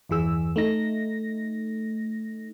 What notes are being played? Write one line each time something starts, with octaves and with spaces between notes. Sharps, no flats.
G1 E2 E3 G#4 E6
A3 D#4 A#6